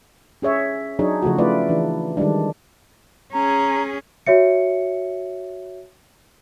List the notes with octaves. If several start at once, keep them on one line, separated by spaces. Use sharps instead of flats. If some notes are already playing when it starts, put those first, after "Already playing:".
C#4 G#4 C#5 E5
F#3 D4 D#4 G#4 C#5
C#3 F3 A3 F#4
A3 E4 F4 B4 D5
E3 D4
D#3 G3 G#3 D4
C#4 G#4 A#5
F#4 C#5 E5 C#7